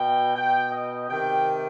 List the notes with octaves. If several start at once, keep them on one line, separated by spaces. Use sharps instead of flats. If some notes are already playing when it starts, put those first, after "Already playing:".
Already playing: B2 G5
B2 G5
D#5
C3 D#3 G5